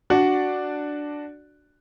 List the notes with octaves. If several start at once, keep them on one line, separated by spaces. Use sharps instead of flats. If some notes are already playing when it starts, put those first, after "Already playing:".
D4 F#4 D5